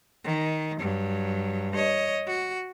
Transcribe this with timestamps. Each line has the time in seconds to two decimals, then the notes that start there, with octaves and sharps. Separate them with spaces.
0.24 D#3
0.79 G2 F#3
1.74 C#5 D#5
2.27 F#4